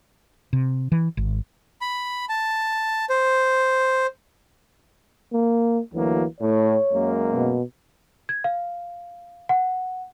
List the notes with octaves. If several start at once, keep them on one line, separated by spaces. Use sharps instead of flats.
C3
E3
G#1
B5
A5
C5
A#3
D2 E3 F#3 A#3
A2 C#5
F#2 G#3 A#3
B2
G#6
F5
F#5